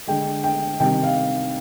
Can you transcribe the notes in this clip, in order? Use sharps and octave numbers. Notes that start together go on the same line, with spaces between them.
D3 G#3 G5
G5
C3 D#3 G3 G5
F5